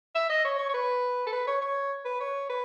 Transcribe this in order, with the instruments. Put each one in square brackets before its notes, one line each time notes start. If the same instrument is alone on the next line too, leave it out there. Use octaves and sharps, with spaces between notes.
[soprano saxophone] E5
D#5
C#5
C#5
C#5
B4
A4
B4
C#5
C#5
B4
C#5
B4